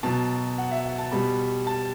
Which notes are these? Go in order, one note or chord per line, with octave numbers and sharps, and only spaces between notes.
B2 F#3 A5
F#5
E5
F#5
A5
B2 G3 B5
A5